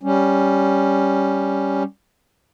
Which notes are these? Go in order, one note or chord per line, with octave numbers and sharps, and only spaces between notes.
G3 C#4